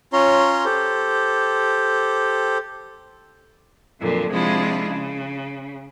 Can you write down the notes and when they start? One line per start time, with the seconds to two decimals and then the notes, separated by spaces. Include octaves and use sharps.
0.13 C#4 F4 C#5 A#5 C6
0.65 G4 A4 C5
4.00 F2 A#2 D3 F#3
4.31 C3 F3 G#3 D4 E4 F4
4.88 C#3